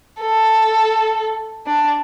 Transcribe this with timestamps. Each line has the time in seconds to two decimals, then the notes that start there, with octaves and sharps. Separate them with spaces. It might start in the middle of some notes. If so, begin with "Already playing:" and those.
0.21 A4
1.67 D4